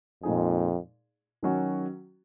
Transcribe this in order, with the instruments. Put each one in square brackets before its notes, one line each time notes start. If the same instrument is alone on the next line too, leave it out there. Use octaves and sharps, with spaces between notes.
[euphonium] F2 [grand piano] A#2 G#3 D#4 G#4
[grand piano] D#3 F#3 C#4 F#4